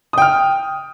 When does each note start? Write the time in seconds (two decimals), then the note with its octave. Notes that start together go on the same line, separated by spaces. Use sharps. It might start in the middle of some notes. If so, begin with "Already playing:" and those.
0.13 D#6
0.18 G5
0.22 F6